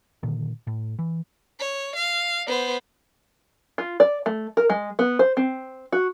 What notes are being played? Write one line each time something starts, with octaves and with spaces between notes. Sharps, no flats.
A#2 D3 D#3
A2
E3
C#5
F5
B3 C5
F4
D5
A3
A#4
G#3
B3
C5
C4
F#4